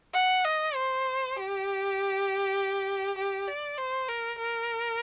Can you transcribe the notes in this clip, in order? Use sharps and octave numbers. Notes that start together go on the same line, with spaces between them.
F#5
D#5
C5
G4
G4
D5
C5
A#4
A#4